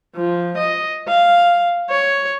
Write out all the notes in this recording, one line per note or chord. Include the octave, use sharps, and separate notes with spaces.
F3
D#5
F5
C#5